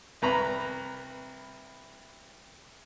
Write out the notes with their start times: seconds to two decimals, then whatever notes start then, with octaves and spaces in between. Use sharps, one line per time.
0.22 C2 B4 A#5 B5